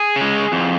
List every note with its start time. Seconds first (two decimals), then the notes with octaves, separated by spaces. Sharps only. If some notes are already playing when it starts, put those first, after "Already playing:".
Already playing: G#4
0.16 C#3 G#3
0.52 F2